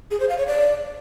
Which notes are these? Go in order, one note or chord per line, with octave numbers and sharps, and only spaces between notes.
G#4
C5
F5
C#5
D5